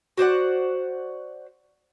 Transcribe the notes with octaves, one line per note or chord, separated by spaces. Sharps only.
F#4 C5 D5 F#5